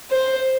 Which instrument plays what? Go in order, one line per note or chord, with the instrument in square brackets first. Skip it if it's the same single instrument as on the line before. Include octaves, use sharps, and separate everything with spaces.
[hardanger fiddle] C5